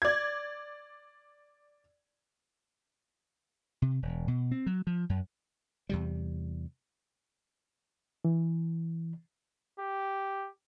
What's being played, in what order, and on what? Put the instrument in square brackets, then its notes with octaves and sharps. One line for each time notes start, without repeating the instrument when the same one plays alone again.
[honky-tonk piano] D5 G#6
[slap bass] C3
E1
B2
C4
F#3
F3
F#2
E2 C3 G3
[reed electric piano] E3
[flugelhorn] G4